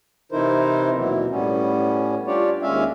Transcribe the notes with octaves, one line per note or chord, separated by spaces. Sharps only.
C3 E3 D#4 E4 A#4 C5
D#2 B2 E3 F#3
A2 G3 B3 C#4
D4 F4 G4 C#5 D5
D#2 G#3 C#4 E5 F5